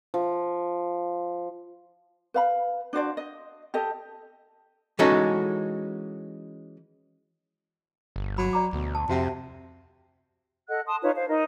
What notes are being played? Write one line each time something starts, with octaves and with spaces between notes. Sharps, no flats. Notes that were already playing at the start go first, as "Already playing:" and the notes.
F3
B4 F5 B5
D4 F#4 C5 D5
D#5
G4 A4 D#5
E3 G#3 C#4 D#4 F#4 A4
G1
F#3 B5
D5 A#5 D6
D2 B2
A5
F2 C3 F#4 E5 F#5
A4 D#5 F#5 F#6
A5 C6 D#6
D#4 F4 B4 C#5
C5 F5
D#4 A#4 D#5